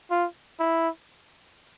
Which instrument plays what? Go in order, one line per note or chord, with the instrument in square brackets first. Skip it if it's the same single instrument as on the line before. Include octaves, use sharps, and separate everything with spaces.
[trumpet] F4
E4